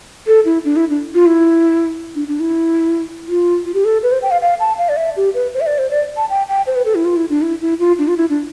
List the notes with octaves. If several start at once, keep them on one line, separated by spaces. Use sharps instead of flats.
A4
E4
D4
E4
D4
F4
E4
D4
D4
E4
F4
F4
G4
A4
B4
C5
G5
F5
F5
A5
F5
D5
E5
G4
B4
C5
E5
D5
C5
D5
A5
G5
G5
C5
B4
A4
E4
F4
E4
D4
E4
E4
F4
D4
F4
E4
D4